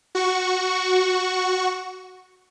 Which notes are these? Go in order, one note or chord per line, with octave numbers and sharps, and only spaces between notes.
F#4 C#6